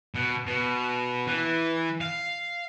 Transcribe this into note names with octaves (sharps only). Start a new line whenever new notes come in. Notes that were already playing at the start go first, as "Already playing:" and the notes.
B2
B2
E3
F5